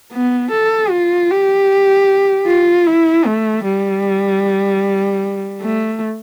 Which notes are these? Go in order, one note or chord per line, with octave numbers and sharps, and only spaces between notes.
B3
A4
F4
G4
F4
E4
A3
G3
A3